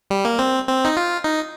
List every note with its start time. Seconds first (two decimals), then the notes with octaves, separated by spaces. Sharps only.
0.10 G3
0.25 A#3
0.39 C4
0.68 C4
0.85 D#4
0.97 F4
1.24 D#4